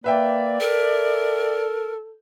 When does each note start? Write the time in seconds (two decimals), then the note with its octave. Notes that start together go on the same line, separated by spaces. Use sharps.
0.04 A#3 B4 D5 E5 G5
0.61 A4 A#4